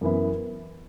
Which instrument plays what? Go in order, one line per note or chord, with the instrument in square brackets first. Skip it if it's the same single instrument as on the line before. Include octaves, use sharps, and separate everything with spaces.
[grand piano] F#2 E3 B3 E4